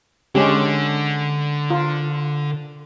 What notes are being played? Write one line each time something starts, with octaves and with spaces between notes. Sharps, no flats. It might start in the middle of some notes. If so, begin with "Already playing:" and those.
D3 G#3 C#4 G4
F4